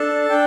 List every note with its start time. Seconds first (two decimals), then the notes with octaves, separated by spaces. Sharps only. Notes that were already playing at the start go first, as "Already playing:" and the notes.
Already playing: D4 A4 A5
0.29 D4 G5